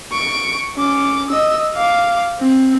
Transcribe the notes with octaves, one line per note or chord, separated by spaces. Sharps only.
C#6 D7
C#4 D6
D#5 E6
F5 D6
C4